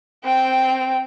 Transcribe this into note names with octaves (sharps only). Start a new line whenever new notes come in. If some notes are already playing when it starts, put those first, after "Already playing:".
C4 G5